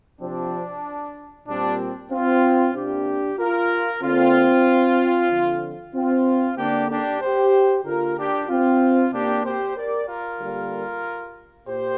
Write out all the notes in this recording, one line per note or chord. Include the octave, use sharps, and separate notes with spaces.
C3 F3 C4 D4
A#2 G3 C4 D4
C4 F4
C3 A#3 D4 G4
F4 A#4
D3 A#3 C4 F4
D3 F3 C4
C4 F4
D3 A#3 D4 G4
D4 G4
G4 C5
D3 A#3 F4 A#4
D4 G4
C4 F4
C3 A#3 D4 G4
G4 C5
A#4 D5
F4 A#4
D3 G3 A#3
A#2 G4 C5